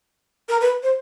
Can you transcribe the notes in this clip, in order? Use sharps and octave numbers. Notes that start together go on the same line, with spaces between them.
A#4
B4
C5